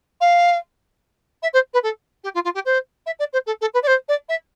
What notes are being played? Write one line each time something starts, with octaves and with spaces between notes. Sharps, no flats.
F5
E5
C5
B4
A4
G4
F4
F4
G4
C5
E5
D5
C5
A4
A4
B4
D5
C5
D5
E5